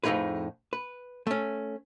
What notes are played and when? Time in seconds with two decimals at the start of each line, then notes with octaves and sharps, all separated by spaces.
0.04 F2 A2 F#3 D#4 G#4 B4
0.73 B4
1.27 A3 C#4